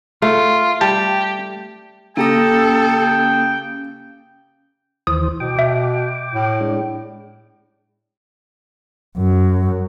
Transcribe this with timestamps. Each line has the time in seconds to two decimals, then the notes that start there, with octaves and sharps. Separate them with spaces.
0.22 A3 F4
0.81 G3 G4 A5
2.17 C#3 A#3 G4 A4 G5 A#5 D#6 A#6
5.07 D#2 E3 C5 D#6
5.40 B2 G5 D6
5.59 B2 E5
6.35 A2
6.61 G#3 D4
9.18 F#2